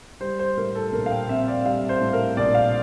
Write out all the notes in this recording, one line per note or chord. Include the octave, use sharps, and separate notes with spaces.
G3 C5
C5
A2 A#4
A4
A#1 A#4
F5
G5
C4 E5
D5
G3 F5
C5
A2
A#4
A#1 D5
F5